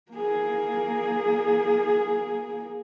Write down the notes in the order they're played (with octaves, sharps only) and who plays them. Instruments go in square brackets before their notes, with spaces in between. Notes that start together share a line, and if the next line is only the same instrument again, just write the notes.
[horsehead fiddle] A#3 G#4